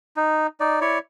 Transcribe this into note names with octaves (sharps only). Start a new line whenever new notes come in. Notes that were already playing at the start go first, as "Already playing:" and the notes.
D#4
D#4 D5
E4 C#5 D5